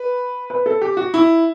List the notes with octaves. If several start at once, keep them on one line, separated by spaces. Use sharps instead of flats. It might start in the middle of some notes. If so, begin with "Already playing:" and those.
Already playing: B4
B4
A4
G4
F#4
E4